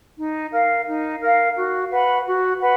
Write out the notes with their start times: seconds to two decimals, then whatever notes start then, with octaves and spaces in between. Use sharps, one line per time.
0.17 D#4
0.52 A#4 F5
0.87 D#4
1.21 A#4 F5
1.55 F#4
1.91 B4 F#5 B5
2.25 F#4
2.60 B4 F#5 B5